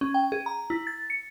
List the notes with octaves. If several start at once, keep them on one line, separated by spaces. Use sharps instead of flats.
C#4
G5
G#4
A#5
E4
A6
C#7